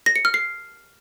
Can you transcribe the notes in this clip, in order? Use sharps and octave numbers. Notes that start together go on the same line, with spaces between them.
A#6
C#7
F6
C7